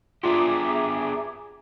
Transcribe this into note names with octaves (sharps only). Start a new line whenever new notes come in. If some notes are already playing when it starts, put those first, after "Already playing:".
B3 D4 F4 G4 G#4 E5 A#5 D6